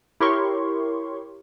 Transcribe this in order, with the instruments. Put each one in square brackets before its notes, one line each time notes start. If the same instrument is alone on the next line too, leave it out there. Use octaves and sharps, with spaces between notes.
[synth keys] E4 G4 A#4 C#5 C6 C#6